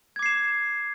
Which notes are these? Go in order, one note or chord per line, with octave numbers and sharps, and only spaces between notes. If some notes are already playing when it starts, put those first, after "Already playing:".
D6 G#6 C7 E7